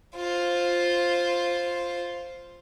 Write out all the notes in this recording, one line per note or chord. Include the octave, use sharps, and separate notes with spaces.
F4 C5